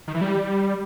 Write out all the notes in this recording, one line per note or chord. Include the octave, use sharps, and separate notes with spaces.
D#3
E3
G3